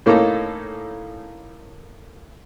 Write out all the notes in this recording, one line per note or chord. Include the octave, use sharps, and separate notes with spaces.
A2 A#3 C#4 D#4 A4 A#5